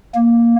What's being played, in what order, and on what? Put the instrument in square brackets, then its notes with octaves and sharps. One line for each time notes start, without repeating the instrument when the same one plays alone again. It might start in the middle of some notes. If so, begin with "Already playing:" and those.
[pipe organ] A#3